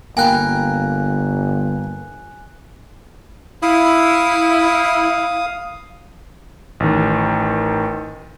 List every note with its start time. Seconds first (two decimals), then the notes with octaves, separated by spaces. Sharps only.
0.17 G1 A#3 G5 G#5 B5 F#6
3.63 E4 F5 D#6
6.80 A1 D#3